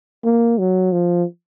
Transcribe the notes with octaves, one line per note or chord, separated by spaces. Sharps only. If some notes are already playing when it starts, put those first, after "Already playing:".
A#3
F#3
F3